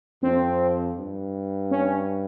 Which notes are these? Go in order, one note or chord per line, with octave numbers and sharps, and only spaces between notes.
F2 C4
G2
C#4